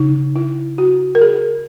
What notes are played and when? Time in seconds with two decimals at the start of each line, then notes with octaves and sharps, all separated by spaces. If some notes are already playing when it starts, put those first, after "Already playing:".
Already playing: C#3 D#4
0.36 E4
0.78 F#4
1.15 A#4
1.21 G#4